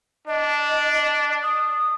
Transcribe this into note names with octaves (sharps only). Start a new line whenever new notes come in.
D4 D#5
D#6